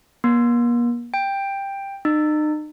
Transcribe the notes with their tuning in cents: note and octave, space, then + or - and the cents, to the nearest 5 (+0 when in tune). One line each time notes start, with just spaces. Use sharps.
A#3 +40
G5 +10
D#4 -40